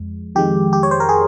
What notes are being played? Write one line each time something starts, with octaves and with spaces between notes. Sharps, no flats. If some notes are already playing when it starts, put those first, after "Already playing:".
Already playing: F2 F3 G#3
F2 D#3 G#3 G4
G4
C#5
C5
A#4
G#4